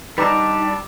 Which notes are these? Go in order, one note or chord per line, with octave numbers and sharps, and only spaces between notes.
G3 D4 D#4 B4 A#5 B5 D6 E6